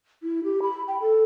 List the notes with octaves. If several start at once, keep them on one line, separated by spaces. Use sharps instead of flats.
E4
G4
B5
G5
A4